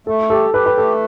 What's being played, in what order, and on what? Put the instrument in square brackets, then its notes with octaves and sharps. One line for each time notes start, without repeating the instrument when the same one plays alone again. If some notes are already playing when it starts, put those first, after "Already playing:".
[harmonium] A3 [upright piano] A4
[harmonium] G4 [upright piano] A4
[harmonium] G4 [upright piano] B4
[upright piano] B4
[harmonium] A3 [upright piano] A4